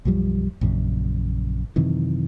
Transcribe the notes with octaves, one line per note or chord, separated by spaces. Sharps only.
B1 F#2 F3 G3
A#1 F#2 C#3
F#2 C3 D#3 E3